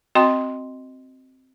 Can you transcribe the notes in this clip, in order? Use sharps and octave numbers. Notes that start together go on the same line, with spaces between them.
C4 F#4 D#5 G5 C6